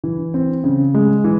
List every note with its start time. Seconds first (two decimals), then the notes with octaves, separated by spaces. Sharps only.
0.04 E3
0.34 C4
0.64 C#3
0.94 G#3
1.24 E3